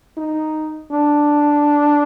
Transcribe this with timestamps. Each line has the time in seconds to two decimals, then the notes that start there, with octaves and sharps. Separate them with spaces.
0.17 D#4
0.91 D4